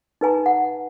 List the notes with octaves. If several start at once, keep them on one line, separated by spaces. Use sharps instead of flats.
D#4 B4 G#5 A#5
F#5